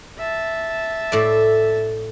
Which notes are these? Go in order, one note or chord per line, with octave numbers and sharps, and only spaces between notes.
E5 A5
A2 D5